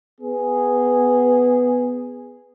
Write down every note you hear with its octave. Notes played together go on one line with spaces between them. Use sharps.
B3 G#4